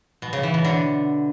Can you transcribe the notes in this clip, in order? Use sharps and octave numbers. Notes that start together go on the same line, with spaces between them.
B2
C#3
E3
B2
D3